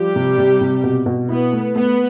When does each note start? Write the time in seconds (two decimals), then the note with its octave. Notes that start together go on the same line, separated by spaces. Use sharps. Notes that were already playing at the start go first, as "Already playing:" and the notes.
Already playing: F3 G3 G4
0.16 C3
0.38 C3
0.61 C3
0.83 B2
1.06 B2
1.29 B3 E4
1.53 A3
1.75 A3 B3